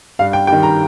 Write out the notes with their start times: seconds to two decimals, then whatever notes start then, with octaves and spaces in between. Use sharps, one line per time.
0.19 G2 F5
0.33 G5
0.47 D#3 G3 G5
0.63 A#5